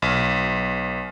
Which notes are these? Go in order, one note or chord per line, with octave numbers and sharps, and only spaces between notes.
B1